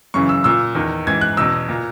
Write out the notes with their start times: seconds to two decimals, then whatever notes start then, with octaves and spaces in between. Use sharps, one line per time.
0.14 F#2 C#3 E3 C#6
0.29 E6
0.44 A#2 E6
0.75 E2 D#3
1.07 G#2 E3 G#6
1.21 F#6
1.37 E2 B2 E6
1.69 A#2